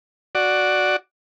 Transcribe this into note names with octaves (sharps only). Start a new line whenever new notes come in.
F#4 D5